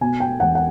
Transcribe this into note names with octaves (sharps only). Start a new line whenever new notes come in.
B2 G#5
G5
E1 F#5
F#5